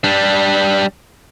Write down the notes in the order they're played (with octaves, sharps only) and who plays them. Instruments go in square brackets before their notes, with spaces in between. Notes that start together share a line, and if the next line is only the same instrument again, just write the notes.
[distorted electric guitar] G3 D4